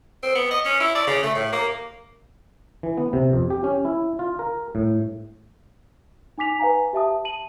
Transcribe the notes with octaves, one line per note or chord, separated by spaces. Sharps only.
C4
B3
D#5
C#4
E4
D5
C#3
A3
A2
A#3
E3
B3
C3
F2
G4
C#4
E4
F4
A#4
A2
D#4 G#5 D6 B6 F7
B4 F5 G#5 A#5
G4 E5 A5 D#6
A5 D#7 F#7